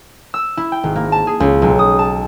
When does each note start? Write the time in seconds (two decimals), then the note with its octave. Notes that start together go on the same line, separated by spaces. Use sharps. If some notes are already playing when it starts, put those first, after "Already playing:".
0.34 E6
0.57 E4
0.72 G5
0.84 G#1
0.96 A#3
1.12 A5
1.27 G#4
1.40 C#2
1.62 B1
1.79 D#6
1.99 A5